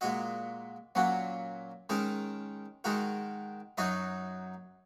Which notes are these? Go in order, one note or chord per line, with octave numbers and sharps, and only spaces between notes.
A#2 G#3 F#4 D#5
A#2 F#3 C#4 F#4
D#3 G#3 C#4 A#4
D#3 G#3 F#4 A#4
F#2 F#3 D#4 F#4 D#5